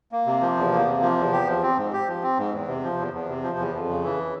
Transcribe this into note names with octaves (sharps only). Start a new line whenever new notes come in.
A#3
C3
F3
E2
A#3
C3
F3
E2
G4
F3
C4
G#2
G4
F3
C4
G#2
E2
C3
F3
E2
E2
C3
F3
E2
F2
C#3
E3